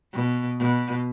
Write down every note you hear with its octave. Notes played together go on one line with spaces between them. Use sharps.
B2
B2